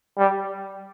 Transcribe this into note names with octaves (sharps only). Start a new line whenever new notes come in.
G3